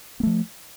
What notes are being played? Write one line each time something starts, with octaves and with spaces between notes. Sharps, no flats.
F3 A3 B3